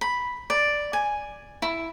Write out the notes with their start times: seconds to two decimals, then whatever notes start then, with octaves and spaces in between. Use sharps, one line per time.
0.01 B5
0.50 D5
0.93 G#5
1.62 E4